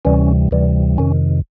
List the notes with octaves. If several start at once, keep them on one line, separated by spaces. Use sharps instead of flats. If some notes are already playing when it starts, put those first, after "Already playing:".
D2 C3 E3 G3 C#4
D2 C3 E3 G3
F2 C3 D#3 C#4